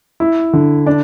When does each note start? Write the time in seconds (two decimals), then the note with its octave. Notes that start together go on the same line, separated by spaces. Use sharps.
0.20 E4
0.53 D3
0.86 D4